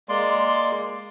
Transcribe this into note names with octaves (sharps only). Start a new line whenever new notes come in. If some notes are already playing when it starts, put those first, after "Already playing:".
G#3 A#3 D5 C6